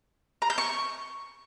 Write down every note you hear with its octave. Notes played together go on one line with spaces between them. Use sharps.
A#5
G6
C#6